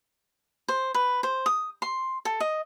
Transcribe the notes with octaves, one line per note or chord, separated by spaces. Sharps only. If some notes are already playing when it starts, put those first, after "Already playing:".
C5
B4
C5
D#6
C6
A4
D#5